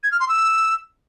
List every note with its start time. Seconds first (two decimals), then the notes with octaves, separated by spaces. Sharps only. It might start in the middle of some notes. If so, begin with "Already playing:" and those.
0.03 G#6
0.12 F6
0.20 C6
0.29 E6